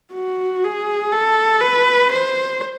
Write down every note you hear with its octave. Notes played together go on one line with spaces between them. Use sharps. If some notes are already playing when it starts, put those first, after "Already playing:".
F#4
G#4
A4
B4
C5